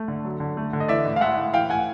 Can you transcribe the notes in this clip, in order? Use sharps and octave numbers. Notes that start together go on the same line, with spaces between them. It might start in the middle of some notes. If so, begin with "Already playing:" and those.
Already playing: A3
D3
F#3
D3
A3
D3
D#5
E3 D5 E5
A2
F5
G#3 E5 F#5
A2
E3 F5 G5
A2 F#5 G#5